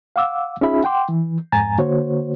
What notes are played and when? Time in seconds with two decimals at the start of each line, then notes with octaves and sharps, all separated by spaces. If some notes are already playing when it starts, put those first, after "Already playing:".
0.16 F5 F#5 D6 E6
0.61 C#4 D#4 F4 G#4 E5 B5
0.84 F#5 G5 C6 D6
1.09 E3
1.52 F2 G#2 G#5 A#5 A6
1.78 D3 A#3 F#4 C5 C#5